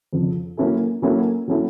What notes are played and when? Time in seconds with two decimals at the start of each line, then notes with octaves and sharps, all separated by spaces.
0.13 F2 C#3 F3
0.57 F#3 A#3 C#4 E4 A4
1.02 F#3 A#3 C#4 E4 A4
1.48 F#3 A#3 C#4 E4 A4